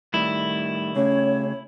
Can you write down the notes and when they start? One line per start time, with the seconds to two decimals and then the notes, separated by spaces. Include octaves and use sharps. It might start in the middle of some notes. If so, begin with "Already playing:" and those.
0.14 A2 D#3 G3 E4
0.96 C#3 A3 C#4 G#4 C#5